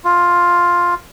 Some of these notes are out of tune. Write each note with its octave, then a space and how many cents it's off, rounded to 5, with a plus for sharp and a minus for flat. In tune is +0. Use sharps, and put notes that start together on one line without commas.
F4 +5